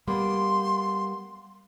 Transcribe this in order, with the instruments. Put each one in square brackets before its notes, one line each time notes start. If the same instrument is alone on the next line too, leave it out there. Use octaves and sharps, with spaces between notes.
[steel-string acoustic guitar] G3 A#3 B3 [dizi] C6